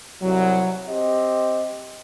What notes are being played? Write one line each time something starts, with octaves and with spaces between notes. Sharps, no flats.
C2 F#3
C4 G4 D#5